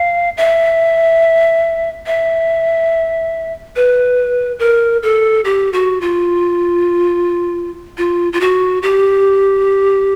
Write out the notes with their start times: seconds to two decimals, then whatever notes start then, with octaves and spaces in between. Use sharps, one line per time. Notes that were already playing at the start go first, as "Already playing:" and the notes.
Already playing: F5
0.37 E5
2.06 E5
3.76 B4
4.59 A#4
5.03 A4
5.45 G4
5.73 F#4
6.01 F4
7.98 F4
8.33 F4
8.41 F#4
8.83 G4